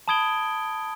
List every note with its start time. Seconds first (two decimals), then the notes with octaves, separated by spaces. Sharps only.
0.08 A5 B5 D#6 G#6 D7 G7